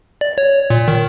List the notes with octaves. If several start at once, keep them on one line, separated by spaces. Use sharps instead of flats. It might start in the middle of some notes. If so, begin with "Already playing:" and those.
D5
C#5
A#2
D#3